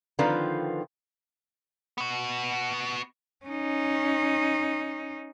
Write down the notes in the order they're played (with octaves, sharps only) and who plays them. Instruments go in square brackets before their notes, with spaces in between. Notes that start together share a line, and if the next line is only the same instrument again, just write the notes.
[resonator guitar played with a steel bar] D3 D#3 F3 C4 F4 B4
[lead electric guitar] B3 F#4
[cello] C#4 D#4